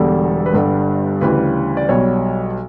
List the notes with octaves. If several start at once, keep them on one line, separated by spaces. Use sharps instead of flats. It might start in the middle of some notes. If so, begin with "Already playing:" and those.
Already playing: E1 E2 D3 G3 A4
B4
G1 G2 D3 G3 A4
D2 C#3 E3 G3 B4
D5
B1 B2 G3 C#5